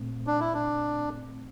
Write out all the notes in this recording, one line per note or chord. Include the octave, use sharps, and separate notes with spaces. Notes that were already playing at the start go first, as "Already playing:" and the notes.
Already playing: A#2 A3 C4
D4
E4
D4